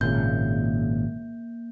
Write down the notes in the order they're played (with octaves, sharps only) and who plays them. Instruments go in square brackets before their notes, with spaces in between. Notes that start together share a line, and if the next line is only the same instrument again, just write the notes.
[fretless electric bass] G#1 A#2 C#3 [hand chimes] A#3 G6